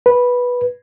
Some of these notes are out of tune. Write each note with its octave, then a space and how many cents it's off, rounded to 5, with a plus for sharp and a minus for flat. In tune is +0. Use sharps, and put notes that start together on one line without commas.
B4 -10